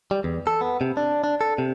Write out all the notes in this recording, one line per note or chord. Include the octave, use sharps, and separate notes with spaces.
G3
E2
A4
B3
C3
D4
D4
A4
C3